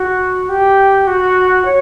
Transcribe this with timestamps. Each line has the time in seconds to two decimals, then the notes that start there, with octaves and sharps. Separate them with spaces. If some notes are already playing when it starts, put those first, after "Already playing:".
Already playing: F#4
0.49 G4
1.07 F#4
1.65 C#5